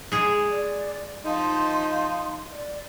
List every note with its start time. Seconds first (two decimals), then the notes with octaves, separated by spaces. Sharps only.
0.12 G#3 G#4
0.51 D5
1.25 F3 D#4 C6
2.52 D5